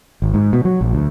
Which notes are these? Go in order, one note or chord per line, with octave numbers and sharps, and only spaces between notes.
G#1
G#2
B2
F#3
A#1
D2